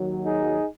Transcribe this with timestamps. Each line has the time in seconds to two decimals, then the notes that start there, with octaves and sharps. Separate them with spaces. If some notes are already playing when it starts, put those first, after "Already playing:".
Already playing: D#2 D#3 F#3
0.24 D#4 G#4